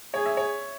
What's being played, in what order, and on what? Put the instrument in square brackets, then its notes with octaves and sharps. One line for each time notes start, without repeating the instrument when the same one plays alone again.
[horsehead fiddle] G#4 [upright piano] C#5
[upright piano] E5
C#5